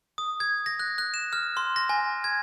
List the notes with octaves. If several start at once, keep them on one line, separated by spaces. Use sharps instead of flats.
D#6
G#6
A#6
F#6
F#6
E7
F6
C6
A#6
G#5
G#6